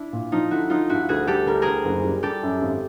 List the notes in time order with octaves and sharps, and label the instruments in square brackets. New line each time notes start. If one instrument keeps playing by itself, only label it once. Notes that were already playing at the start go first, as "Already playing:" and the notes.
Already playing: [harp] D4 E4
[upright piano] A#2
[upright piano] F3 [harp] D#4 F4
[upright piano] D3 [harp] E4 F#4
[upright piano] F3 [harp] D#4 F4
[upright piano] G2 [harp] E4 F#4
[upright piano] D2 [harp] F#4 G#4
[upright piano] G3 [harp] G4 A4
[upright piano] D2 [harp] A#4
[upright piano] D2 [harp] G#4 A#4
[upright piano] F#1
G3
[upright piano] G3 [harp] G4 A4
[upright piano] F#2
G#1